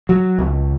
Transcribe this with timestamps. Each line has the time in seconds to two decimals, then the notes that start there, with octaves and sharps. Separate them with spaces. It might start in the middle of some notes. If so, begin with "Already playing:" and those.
0.09 F#3
0.39 C#2